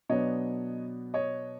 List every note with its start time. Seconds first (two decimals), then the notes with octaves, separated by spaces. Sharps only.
0.09 B2 F#3 B3 D4 C#5 D#5
1.14 C#5 D#5